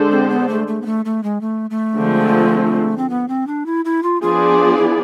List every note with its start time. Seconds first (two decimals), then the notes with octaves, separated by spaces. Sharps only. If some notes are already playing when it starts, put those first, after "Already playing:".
Already playing: D3 G#3 D4 A4 C5
0.11 C4
0.30 B3
0.49 A3
0.67 A3
0.82 B3
0.86 A3
1.05 A3
1.23 G#3
1.41 A3
1.70 A3
1.97 D3 F3 G#3 C4
2.98 C4
3.10 B3
3.28 C4
3.47 D4
3.66 E4
3.85 E4
4.03 F4
4.22 F3 B3 D4 F4 G#4 D5
4.77 E4